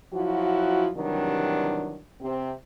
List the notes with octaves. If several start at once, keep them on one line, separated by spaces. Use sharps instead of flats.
F3 F#3 E4 F#4
C3 D#3 E3 F#3 G3 D4
C3 C4